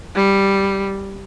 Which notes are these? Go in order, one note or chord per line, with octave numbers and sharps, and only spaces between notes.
G3